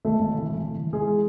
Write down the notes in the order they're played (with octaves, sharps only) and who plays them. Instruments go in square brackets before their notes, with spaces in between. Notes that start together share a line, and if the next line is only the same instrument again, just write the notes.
[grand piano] G#1 A3 A4
G#1
E3
E3
E3
E3
E3 G#3 G#4